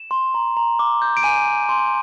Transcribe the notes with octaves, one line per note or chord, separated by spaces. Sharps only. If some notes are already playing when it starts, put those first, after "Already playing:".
Already playing: E7
C6
A#5
A#5
D6
G6
D7
G#5 D#7
G#5
C6